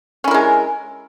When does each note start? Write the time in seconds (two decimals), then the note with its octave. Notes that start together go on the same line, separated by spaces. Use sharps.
0.24 C#4
0.28 E4
0.31 A#4
0.34 G#3